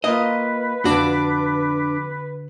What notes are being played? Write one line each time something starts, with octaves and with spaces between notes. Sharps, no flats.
A#3 F4 B4 D#5
F2 D3 D4 F#4 D6